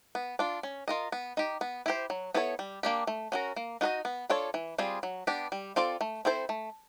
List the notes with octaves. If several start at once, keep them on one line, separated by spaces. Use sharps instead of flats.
B3
D4 F4
C#4
F4 A#4 D#5
B3
D#4 G4
B3
E4 G4 C5
F#3
B3 E4 A4 C#5
G3
A#3 D4 G4
A3
C#4 F#4 A#4
A#3
D#4 F#4 B4 D#5
B3
D4 F4 A4 C#5
E3
G3 C4 F4 G#4
F#3
B3 D4 G4
G3
C4 F4 A4 D5
A3
C4 E4 A4 C5
A3